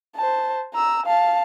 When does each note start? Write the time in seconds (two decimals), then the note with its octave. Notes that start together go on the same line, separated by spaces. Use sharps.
0.16 C5 A5
0.74 A#5 E6
1.06 F5 A5